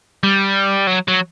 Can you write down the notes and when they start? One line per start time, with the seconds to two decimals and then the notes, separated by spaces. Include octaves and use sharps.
0.24 G3
0.87 F#3
1.08 F#3